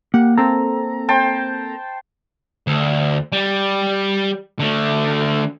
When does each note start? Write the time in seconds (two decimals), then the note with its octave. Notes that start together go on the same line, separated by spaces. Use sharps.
0.14 A#3 G4 F#5
0.38 A#3 C4 A4 A#5
1.09 C5 G5 A5
2.67 D2
3.32 G3
4.59 D3 A3